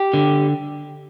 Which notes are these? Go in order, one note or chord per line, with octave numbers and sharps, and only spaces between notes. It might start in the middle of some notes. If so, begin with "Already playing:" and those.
Already playing: G4
D3